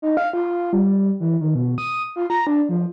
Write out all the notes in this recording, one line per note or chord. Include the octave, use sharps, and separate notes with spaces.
D#4
F5
F4
G3
E3
D#3
B2
D#6
F4
A#5
D4
F3